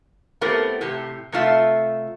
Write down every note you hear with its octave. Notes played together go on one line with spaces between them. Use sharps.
A3 B3 C4 E4 G4 A#4
A2 C3 G4
C3 A3 F4 E5